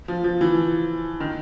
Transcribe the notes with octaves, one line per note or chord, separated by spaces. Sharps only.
F3
F3
E3
D#3